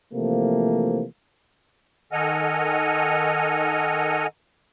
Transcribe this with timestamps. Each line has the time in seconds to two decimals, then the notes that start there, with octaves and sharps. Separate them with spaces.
0.13 C3 E3 F3 A3 A#3
2.12 D#3 A4 D#5 F#5 G#5 F6